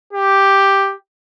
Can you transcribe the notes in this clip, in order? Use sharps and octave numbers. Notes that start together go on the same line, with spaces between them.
G4